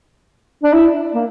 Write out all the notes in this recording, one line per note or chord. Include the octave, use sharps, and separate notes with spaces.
D4
E4
A#3